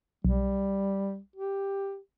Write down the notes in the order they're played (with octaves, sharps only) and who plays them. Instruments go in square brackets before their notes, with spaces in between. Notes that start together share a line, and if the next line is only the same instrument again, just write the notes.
[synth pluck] B1 [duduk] G3
[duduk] G4